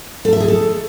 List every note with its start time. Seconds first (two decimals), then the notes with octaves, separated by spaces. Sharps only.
0.25 A4
0.33 E5
0.40 G#4
0.48 A4